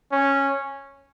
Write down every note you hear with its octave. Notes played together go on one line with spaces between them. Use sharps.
C#4